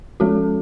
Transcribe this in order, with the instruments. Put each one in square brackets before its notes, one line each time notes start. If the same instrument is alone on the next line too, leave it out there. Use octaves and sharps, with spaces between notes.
[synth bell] F3 G#3 C#4 F#4 A4